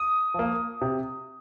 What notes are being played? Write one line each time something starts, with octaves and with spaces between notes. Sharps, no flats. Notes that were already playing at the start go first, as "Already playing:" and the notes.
Already playing: D#6
F3 A#3
C3